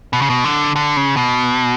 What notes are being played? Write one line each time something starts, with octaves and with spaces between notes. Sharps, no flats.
B2
C#3
B2
D3
D3
C#3
B2